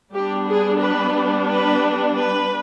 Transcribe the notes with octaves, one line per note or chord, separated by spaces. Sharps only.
G3 B3 D4 G4
G#4
B4
B4
B4